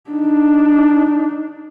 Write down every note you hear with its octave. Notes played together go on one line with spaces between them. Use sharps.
D4 D#4